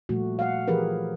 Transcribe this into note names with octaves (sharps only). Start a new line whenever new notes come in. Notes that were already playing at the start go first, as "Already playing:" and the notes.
A#2 F3 G3 A3 F#4
F5 F#5
E3 F3 G4 G#4 A#4 B4